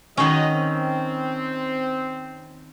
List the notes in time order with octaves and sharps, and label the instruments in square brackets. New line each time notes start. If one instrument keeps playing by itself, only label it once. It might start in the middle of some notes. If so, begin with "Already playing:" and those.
[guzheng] D#3 C#4 [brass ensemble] F#3 G#3 D#5
[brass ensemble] C4